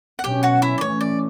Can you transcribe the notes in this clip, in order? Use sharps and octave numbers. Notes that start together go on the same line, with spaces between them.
F#5
B2 F#3 C#4 G4 G5
F#4 F#5
E4 E5
D5
E3 A3 C#4 C#5
D5